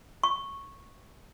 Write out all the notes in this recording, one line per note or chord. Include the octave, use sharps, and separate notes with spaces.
C#6